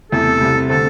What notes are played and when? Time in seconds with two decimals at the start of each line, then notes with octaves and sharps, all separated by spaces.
0.12 E2 C3 A3 A4
0.41 C2 C3 G3
0.69 D3 A3 C4 A4